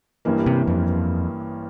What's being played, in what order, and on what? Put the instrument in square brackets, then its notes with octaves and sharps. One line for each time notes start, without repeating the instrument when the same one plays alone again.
[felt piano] A1 G2 E3 A#3
[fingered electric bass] C3
F2